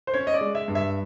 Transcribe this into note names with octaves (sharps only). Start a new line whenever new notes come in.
C5
C#4 C#5
D#5
D5
G#3
E5
G2
E5